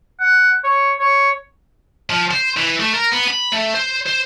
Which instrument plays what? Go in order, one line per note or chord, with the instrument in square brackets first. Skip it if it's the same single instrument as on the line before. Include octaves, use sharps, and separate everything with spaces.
[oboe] F#5
C#5
C#5
[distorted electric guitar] F3
C5
E3
A3
A#4
B3
B5
A3
C5
C5